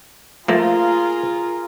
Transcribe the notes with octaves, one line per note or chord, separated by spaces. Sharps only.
F3 A3 A#3 F4 G#4 A#4